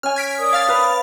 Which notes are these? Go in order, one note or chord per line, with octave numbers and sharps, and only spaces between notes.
C#4 G#5 F6
G#6 B6 D7
A#4 D5 D#6
F5 F6 A6
B4